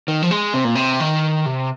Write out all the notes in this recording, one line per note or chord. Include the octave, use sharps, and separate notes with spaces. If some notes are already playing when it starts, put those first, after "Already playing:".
D#3
F3
G#3
C3
A#2
C3
D#3
C3